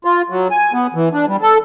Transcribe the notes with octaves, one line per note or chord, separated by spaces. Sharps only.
F4
F#3
G#5
B3
E3
D4
G3
A4